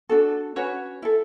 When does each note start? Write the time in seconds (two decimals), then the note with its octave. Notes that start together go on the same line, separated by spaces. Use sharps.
0.09 D4 F#4 A4
0.56 C#4 F#4 B4 C#5
1.02 E4 A4